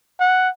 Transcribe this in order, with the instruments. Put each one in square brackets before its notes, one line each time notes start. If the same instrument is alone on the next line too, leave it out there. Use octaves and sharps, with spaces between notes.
[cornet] F#5